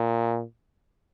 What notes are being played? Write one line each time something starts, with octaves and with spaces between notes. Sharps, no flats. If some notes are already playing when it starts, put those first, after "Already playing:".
Already playing: A#2